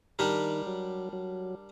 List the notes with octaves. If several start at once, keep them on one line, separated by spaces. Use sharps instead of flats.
D#3 G3 D4 G4 A#4
F#3
F#3